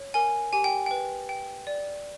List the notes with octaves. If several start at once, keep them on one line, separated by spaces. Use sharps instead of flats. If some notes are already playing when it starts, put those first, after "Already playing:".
Already playing: C#5
A#4 G#5
G4 G#5
G5
B4 G5
G5
D5